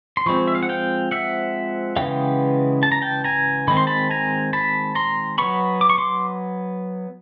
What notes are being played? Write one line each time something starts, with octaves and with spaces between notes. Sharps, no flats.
C6
F3 G#3 C4 B5 C#6
E5
F5
F#5
F5 G5
E5 F#5
C#3 E3 G#3 B3 F5 G5
A5
A#5
G5 A5
G#5 A#5
D#3 G#3 C4 B5
C6
A5 B5
G#5 A#5
A5 B5
A#5 C6
F#3 B3 B5 C#6
D6
C#6
C6 D6